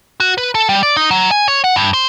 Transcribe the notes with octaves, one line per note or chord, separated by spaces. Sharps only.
F#4
B4
A4
G3
D5
D#4
F#3
G#5
C#5
F#5
G2
C5